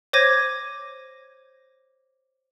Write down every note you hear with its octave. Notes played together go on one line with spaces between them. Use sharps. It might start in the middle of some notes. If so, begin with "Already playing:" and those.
C5 C#5 D6 G#6 A#6 D#7